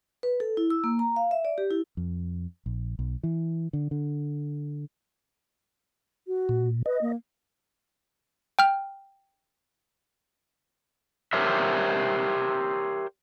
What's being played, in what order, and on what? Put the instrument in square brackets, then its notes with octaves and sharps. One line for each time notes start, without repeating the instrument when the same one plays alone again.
[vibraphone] B4
A4
E4
E6
A#3
A#5
F5
E5
D5
G4
E4
[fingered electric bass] F2
A#1
B1
E3
D3
D3
[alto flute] F#4
[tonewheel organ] A#2
[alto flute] B4 [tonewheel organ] D#5
[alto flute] A#3
[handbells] G5 F6
[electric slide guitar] G4 A#4 C5 C#5 E5